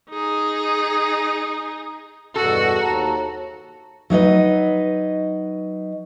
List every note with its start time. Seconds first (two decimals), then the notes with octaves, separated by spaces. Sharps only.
0.10 D#4 G#4
2.36 E2 G2 B2 F#4 A4
2.81 D#2 A5 A#5
4.10 F#3 D#4 B4 D#5